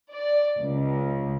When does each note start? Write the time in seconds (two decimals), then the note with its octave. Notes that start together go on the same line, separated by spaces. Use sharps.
0.12 D5
0.59 C#2